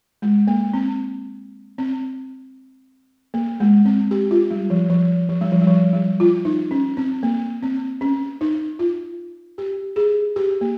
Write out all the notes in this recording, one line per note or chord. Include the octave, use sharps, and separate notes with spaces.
G#3
A#3
C4
C4
A#3
G#3
C4
G4
F4
G3
F3
F3
F3
G3
F3
G3
F3
G3
F4
D#4
C#4
C4
A#3
C4
C#4
D#4
F4
G4
G#4
G4
A#3